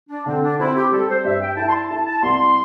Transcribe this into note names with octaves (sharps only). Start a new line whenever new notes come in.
D4
D3 C4
D4
C4 E4
G4
G3 A4
C5
G2 E5
G5
E4 A5
C6
A5
E4 A5
A5
C2 C6